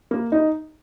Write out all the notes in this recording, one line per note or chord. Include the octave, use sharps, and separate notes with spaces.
A#3
D#4